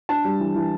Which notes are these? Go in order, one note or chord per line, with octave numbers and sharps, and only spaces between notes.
D4 A5
G3
E3
E3